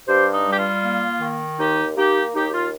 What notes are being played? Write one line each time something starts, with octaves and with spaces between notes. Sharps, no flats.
G2 G4 C5
D#4
G3
G4
F4
A#3
D#3
D#2 D#4 G4
A#3 D#4 G4
D#2 D#4 G4
F4